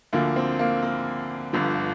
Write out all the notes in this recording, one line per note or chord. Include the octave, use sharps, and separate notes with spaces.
D2 D3 F3 A#3
C4
A#3
A#3
G1 G2 D3 F3